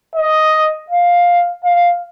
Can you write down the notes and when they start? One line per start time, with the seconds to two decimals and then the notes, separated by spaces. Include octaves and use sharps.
0.16 D#5
0.90 F5
1.64 F5